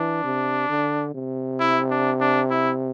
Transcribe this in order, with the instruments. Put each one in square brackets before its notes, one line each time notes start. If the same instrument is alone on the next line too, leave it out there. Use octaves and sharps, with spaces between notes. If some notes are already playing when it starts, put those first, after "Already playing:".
Already playing: [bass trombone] E3 [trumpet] D4
[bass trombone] C3
D3
C3
[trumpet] E4
D4
D4
E4